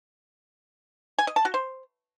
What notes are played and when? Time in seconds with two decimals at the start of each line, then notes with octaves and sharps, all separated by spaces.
1.19 G#5
1.27 D#5
1.36 A5
1.45 F#4
1.54 C5